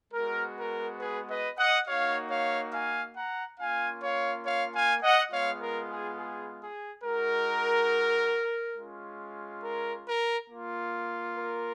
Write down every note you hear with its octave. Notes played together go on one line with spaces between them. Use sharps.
G#3 B3 F#4 A#4
A#4
G#4 B4
B4 D#5
D#5 F#5
A#3 D#4 F#4 C#5 F5
C#5 F5
F5 G#5
F#5 A#5
A#3 C#4 F4 F5 G#5
C#5 F5
C#5 F5
F5 G#5
D#5 F#5
G#3 B3 F4 C#5 F5
A#4
G#4
G#4
G#4
G#3 D#4 F#4 A#4
G#3 C#4 F4
A#4
A#4
A#3 F4
A#4